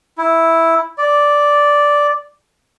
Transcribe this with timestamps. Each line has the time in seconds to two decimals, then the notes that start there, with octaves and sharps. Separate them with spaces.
0.18 E4
0.98 D5